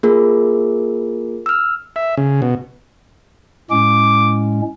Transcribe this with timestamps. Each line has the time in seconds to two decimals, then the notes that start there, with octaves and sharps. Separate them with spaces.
0.03 A#3 F4 G#4 A#4
1.46 E6 F6
1.96 E5
2.17 C#3
2.42 B2
3.71 A2 G#3 C#4 D6